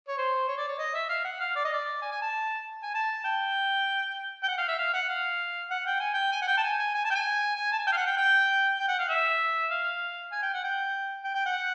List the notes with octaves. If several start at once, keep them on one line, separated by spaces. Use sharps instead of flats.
C#5
C5
C#5
D5
C#5
D#5
E5
F5
F#5
F5
D5
D#5
D5
G#5
G#5
A5
G#5
A5
G5
G5
F#5
F5
E5
F5
F#5
F5
F#5
G5
G#5
G5
G#5
F#5
G5
A5
G#5
G#5
G#5
A5
G5
G#5
G#5
A5
G#5
G5
F5
F#5
G5
G5
G5
F#5
F5
E5
F5
G#5
G5
F#5
G5
G5
G5
F#5